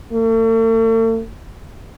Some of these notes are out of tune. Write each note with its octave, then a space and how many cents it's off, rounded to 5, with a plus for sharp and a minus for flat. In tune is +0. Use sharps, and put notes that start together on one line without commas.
A3 +40